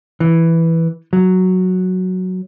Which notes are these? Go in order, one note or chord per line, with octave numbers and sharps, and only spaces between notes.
E3
F#3